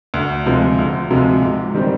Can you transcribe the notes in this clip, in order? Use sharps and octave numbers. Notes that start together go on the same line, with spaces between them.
D2
C3 F3 G#3
D2
C3 F3 G#3
G#2
D#3 G3 C4